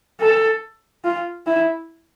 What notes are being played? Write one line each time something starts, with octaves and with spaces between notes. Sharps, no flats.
A4
F4
E4